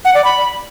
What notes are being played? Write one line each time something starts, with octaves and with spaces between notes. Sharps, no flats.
F#5
D5
B5